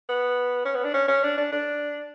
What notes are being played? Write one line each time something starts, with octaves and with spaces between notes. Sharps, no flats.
B3
C#4
B3
D4
C#4
C#4
D4
D4
D4